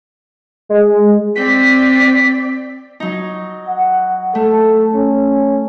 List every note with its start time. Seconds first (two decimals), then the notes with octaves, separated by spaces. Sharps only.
0.69 G#3
1.35 C4 D5 B6
3.00 F#3 D#4
3.68 F#5
4.35 A3 A4
4.95 C#4